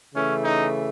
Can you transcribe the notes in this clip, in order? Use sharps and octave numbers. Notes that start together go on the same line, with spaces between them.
C#3 E3 A3 C#4
D#4